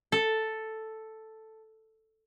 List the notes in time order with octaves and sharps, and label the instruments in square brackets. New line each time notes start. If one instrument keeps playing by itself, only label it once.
[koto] A4